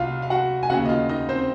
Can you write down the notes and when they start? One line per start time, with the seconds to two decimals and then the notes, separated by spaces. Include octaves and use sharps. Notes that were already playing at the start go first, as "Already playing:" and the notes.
Already playing: C2 F4 F#4 F5
0.22 F5
0.30 F#4 F#5
0.63 G#5
0.70 C#3 F#4 F#5
0.73 D#2
0.85 D#5
0.89 F4 F5
1.09 D#4 D#5
1.29 C4 C5